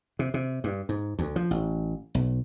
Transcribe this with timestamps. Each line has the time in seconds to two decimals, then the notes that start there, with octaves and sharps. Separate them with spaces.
0.19 C3
0.34 C3
0.64 G2
0.89 G#2
1.19 D2
1.36 F3
1.51 A1
2.15 B1